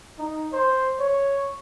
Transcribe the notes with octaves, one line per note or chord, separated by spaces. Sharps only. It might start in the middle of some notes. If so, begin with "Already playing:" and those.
D#4
C5
C#5